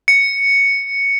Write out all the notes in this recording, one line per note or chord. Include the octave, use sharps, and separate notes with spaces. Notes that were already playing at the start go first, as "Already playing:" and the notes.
C#7